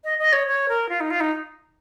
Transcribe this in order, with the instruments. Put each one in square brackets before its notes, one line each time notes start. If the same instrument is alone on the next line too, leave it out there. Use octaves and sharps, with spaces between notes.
[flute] D#5
D#5
C#5
C#5
A#4
F4
D#4
F4
D#4